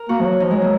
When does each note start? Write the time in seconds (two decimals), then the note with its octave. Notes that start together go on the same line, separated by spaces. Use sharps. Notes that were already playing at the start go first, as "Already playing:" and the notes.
Already playing: A#4
0.09 A#3 F#4
0.21 F3
0.25 F#3
0.40 F3 D#4
0.51 G#3
0.56 F#3
0.62 A#3